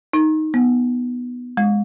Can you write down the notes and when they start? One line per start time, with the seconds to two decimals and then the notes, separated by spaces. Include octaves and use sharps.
0.13 D#4
0.54 B3
1.57 G#3